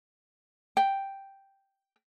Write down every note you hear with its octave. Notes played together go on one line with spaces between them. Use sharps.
G5